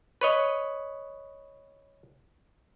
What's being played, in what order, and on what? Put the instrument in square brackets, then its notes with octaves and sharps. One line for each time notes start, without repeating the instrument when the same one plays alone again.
[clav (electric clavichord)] B4 C#5 D#5